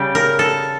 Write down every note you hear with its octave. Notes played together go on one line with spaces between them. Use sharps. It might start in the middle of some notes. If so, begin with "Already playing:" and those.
Already playing: C#3 G3 G4
A#4
A4